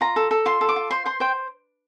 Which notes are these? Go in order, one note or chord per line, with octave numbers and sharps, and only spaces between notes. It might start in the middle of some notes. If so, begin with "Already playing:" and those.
F4 A#5
A4
A4
F4 C6
A4
D6
F4
C5 C6
C5 C6
C5 G5